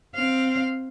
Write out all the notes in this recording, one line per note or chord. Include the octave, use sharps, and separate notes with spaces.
C4 F5